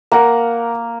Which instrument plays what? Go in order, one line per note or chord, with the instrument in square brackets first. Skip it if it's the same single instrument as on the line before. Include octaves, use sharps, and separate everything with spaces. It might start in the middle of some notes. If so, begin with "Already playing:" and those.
[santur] A#3 [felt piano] A#4 F#5 A#5